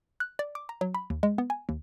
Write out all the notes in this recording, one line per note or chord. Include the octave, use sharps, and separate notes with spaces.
F#6
D5
D6
A#5
F#3
B5
D#2
G#3
B3
G#5
D#2